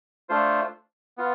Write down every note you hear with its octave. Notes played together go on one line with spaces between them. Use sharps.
A3 D4 F4 C5
B3 F4